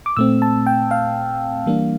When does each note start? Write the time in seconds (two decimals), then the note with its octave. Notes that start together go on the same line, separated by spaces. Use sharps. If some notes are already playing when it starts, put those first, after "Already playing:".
0.06 D6
0.17 A#2 A3 C4 E6
0.42 A5
0.67 G5
0.91 F5
1.66 E3 G3 A#3 D4